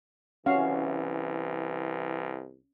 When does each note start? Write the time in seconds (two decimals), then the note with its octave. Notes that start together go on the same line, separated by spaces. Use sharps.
0.46 C2 E3 C#4 F#4 E5 F5